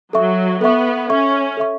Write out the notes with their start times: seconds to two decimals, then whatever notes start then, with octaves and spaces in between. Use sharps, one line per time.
0.13 F#3 A4 E5 C#6
0.61 B3 A4 E5 C#6
1.09 C#4 A4 E5 C#6
1.57 A4 E5 C#6